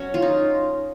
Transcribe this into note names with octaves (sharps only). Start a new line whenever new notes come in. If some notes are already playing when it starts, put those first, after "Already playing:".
Already playing: F#3 C#4
F4
D#4